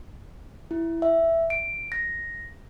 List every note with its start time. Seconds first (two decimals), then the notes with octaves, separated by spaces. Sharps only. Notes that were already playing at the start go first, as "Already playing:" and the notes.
0.71 E4
1.02 E5
1.50 D7
1.92 A#6